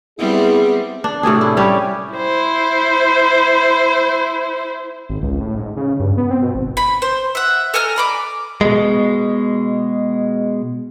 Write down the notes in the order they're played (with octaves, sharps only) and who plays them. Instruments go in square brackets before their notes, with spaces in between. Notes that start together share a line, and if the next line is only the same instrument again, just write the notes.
[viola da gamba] G3 B3 C4 [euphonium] E4 [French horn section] G#4
[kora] D4
A2 C3 D4 G#4
E4
G3 C#4 G4
[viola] E4 C5
[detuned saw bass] G#1
C#2
A2
G#2
C#3
G2
B3
C4
B2
G#1
[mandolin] B5
C5
E5 F#5
A4 G#5 A#5 F6
D5 B5 D6
[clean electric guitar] B2 G#3